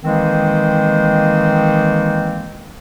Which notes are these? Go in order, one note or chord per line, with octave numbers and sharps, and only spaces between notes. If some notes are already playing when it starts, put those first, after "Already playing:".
D#3 E3 G#3 A#3 C4 D#4